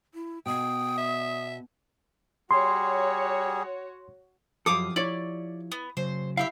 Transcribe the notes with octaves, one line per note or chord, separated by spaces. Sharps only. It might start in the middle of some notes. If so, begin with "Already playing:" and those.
E4
B2 G5 D#6
E5
G3 F#4 G#4 C#5 C6
F#2 F3 G4 A4 F5 D6 D#6
E4 C#5 D5
B3
C#3 F#3 C5
E4 G4 E5 F5